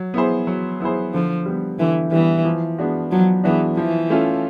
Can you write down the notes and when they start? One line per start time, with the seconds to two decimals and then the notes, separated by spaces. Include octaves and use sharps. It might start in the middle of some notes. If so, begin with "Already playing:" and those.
Already playing: F#3
0.14 B3 E4 G#4 C5
0.47 F#3
0.80 B3 E4 G#4 C5
1.14 D3 F3
1.46 G3 B3
1.79 D3 E3
2.12 E3 G3 B3
2.45 F3
2.78 G#3 B3 D4 F#4
3.11 F3 F#3
3.44 E3 G#3 B3 D4 F#4
3.77 E3 F3
4.10 A3 C#4 F4